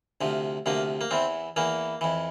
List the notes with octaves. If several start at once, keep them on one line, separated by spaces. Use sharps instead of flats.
D2 C3 F3
D2 C3 F3 A#3
A#3
E2 E3 C4
E2 E3 A#3
F2 E3